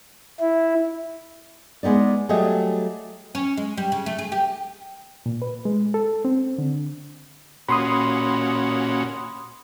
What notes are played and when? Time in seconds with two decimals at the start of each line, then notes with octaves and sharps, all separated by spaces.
0.40 E4
1.83 G#3 B3 D#4 D5
2.29 F#3 G3 A3 G4 G#4 D#5
3.35 C#4
3.57 G#3
3.78 G3
3.92 C#3
4.06 A3
4.18 G#4
4.32 G4
5.26 A#2
5.42 B4
5.65 G#3
5.94 A4
6.25 C4
6.58 D3
7.68 A#2 C#4 F#4 B5 C6 D#6